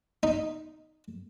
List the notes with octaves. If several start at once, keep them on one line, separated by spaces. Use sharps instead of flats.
D#4